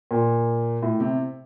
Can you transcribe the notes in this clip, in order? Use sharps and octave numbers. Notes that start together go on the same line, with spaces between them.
A#2
A2
C3